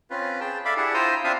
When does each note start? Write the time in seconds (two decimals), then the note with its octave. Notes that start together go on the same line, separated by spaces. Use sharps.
0.10 C4 C#4 F4 B4
0.40 G#4 G5 A5
0.65 A4 D5 E5 F5 B5 D6
0.77 D4 E4 G4 G#4 F#5 A5
0.94 E4 F4 C5 G5 A#5 D#6
1.24 C4 D4 F4 E5 F5 D#6